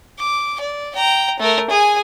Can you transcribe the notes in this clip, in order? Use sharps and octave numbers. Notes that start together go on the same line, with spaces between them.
D6
D5
G5 A#5
A3 A#4
G#4 G#5